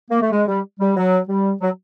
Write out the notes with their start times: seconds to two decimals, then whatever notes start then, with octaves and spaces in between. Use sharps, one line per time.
0.10 A#3
0.21 A3
0.31 G#3
0.47 G3
0.80 G3
0.97 F#3
1.29 G3
1.61 F#3